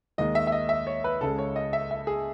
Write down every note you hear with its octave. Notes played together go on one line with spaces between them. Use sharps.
D#2 D#3 G#3 D#5
E5
E5
D#5
E5
C#5
B4
C#2 C#3 G#3 A4
C#5
D#5
E5
E5
G#4